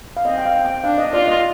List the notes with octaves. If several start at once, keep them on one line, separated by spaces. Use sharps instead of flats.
F5
C4 D#5
G5
F5
G5
D4 F5
D#5
F4 D5
D#5